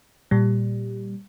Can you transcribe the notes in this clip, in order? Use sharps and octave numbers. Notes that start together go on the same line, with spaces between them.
A#2 G3